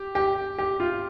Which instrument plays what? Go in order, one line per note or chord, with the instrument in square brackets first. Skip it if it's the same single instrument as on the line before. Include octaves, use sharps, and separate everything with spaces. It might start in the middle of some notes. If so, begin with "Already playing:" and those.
Already playing: [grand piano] G4
G4
G4
F4